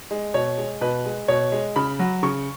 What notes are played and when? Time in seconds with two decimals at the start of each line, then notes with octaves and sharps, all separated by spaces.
0.11 G#3
0.34 B2 C#5
0.58 G#3
0.81 B2 B4
1.05 G#3
1.28 B2 C#5
1.52 G#3
1.76 C#3 B5
1.99 F#3
2.23 C#3 C#6